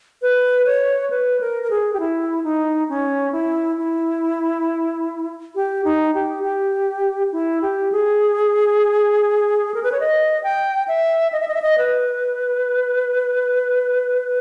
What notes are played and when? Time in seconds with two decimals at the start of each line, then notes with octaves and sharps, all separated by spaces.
0.22 B4
0.66 C#5
1.10 B4
1.41 A#4
1.63 A#4
1.70 G#4
1.93 G4
2.00 E4
2.44 D#4
2.89 C#4
3.32 E4
3.78 E4
5.55 G4
5.85 D#4
6.14 G4
6.43 G4
7.32 E4
7.62 G4
7.92 G#4
9.74 A#4
9.83 B4
9.92 C#5
10.00 D#5
10.43 G5
10.88 E5
11.33 D#5
11.40 E5
11.48 D#5
11.54 E5
11.62 D#5
11.78 B4